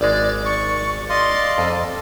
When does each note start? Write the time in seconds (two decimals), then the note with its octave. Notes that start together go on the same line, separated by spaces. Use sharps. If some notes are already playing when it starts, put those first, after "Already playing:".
0.01 G#1 G#3 D5
0.45 D5 C#6
1.09 D5 D#5 F5 C6
1.58 F2 A4